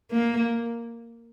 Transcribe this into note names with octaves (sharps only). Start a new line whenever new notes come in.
A#3